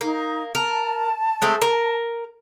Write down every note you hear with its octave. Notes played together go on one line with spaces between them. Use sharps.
A#3 D#4
A#4 A5
G#3 A3 C4
A#4